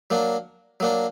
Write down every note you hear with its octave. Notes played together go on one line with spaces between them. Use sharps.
F#3 A#3 D4
F#3 A#3 D4